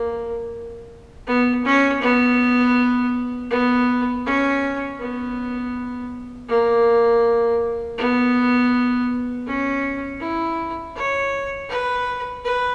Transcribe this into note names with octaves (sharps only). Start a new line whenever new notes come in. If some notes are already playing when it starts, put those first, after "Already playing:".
Already playing: A#3
B3
C#4
B3
B3
C#4
B3
A#3
B3
C#4
E4
C#5
B4
B4